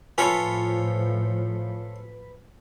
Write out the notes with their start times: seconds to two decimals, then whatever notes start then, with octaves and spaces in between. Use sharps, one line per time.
0.18 A2 F3 F4 A4 B4 C#5 G#5